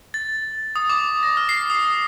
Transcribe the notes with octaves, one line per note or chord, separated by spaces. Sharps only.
A6
D#6
D6
A#6
F6
C7
D#6